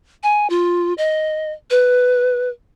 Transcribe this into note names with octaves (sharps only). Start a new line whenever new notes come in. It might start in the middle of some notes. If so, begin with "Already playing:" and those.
G#5
F4
D#5
B4